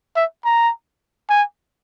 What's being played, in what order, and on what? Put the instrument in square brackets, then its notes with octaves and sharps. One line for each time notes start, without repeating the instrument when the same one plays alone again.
[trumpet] E5
A#5
G#5